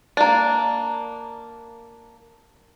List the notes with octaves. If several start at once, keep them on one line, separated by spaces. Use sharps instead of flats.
A#3 D4